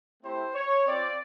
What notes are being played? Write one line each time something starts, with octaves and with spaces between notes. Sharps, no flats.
A3 C4 E4 G4 C5
C#5
C4 F4 D5